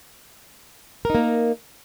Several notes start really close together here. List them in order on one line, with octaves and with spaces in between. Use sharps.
A#4 D#4 A#3